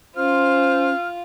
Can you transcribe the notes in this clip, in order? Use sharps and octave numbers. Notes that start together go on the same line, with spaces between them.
C#4 F4 C5 F6